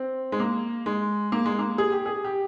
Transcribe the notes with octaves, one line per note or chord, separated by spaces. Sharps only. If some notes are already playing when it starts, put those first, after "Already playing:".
Already playing: C4
G#3
A#3
G#3
A#3
G#3
A#3
G#4
G4
G#4
G4